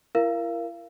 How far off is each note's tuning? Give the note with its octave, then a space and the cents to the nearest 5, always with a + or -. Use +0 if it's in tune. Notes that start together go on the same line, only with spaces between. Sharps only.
E4 +35 A#4 +5 F5 -30